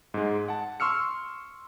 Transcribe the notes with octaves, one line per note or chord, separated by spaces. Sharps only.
G#2 G#3
F#5 A5
C6 C#6 E6 F6 C#7